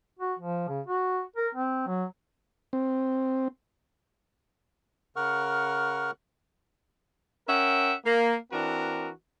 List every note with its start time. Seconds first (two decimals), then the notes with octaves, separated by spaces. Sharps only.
0.19 F#4
0.39 F3
0.69 C#3
0.86 F#4
1.36 A#4
1.55 C4
1.87 F#3
2.73 C4
5.16 C#3 A#4 F#5 C#6 F6
7.48 C#4 A#4 E5 F#5 G5
8.05 A#3
8.52 E3 C4 D4 F#4 A#4